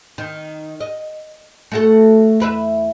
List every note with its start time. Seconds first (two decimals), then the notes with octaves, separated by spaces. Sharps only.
0.18 D#3
0.81 D#5
1.72 A3 F#4 A4
2.40 E2 B4 E5